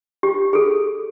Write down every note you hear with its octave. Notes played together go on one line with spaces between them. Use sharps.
G4
G#4 A4